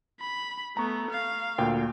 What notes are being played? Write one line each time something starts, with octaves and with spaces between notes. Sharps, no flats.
B5
A3 B3 A#5 C#6
F5
D2 A#2 G5